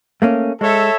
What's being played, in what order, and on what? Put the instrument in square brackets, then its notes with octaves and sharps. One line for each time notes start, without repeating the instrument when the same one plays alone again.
[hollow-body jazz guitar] A3 A#3 C#4
[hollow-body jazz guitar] G#3 [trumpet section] A4 C#5 E5